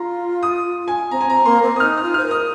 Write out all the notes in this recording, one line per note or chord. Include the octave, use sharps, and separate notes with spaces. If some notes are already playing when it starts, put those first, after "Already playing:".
Already playing: F4 A#5 C6
D#6
G#5
C4 A#5
G#5
C4 A#5
A#3 C6
C4
D#6
D#4 F6
D#6
F4
C5 F6
A#4 D#6